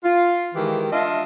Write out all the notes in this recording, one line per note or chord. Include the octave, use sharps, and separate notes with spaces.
F4
D#3 E3 G#3 G4
D4 F4 D#5 E5